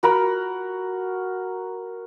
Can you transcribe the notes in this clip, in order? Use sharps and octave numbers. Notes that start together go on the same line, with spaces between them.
F#4 A#4 B5